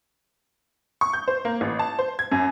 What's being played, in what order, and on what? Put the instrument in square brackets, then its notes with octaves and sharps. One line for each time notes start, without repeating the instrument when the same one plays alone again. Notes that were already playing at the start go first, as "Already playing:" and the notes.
[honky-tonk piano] C#6
G6
C5
A#3
A1
A5
C5
G#6
F#2